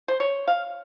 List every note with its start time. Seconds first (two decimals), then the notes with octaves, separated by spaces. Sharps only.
0.08 C5
0.20 C#5
0.48 F5